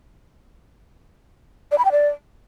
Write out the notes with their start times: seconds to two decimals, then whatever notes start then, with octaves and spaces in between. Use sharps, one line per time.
1.72 D5
1.78 B5
1.85 G5
1.92 D5